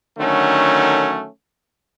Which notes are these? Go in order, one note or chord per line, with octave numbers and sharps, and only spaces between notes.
D3 D#3 F#3 A3 C#4